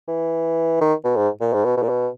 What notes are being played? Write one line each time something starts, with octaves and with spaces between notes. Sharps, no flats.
E3
D#3
B2
G#2
A#2
G#2
B2
B2
A#2
B2